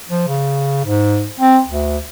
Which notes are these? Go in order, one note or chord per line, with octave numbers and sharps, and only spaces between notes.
F3
C#3
G#2
C4
D2